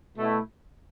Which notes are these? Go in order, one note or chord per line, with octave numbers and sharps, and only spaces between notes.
B2 A3 E4